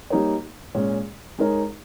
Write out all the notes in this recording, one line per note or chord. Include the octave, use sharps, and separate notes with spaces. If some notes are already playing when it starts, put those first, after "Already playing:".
G3 A#3 D#4 A#4 C#5
A#2 G#3 C#4
G#3 D#4 A#4 C#5